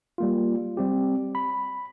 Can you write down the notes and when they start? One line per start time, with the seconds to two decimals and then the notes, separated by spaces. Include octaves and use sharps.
0.18 G3 A#3 F4
0.77 G3 C4 G4
1.35 B5